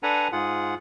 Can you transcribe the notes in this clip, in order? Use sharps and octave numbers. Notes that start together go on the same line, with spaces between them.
D4 A4 B4 F#5 G#5 A#5
G#2 F4 G#4 F#5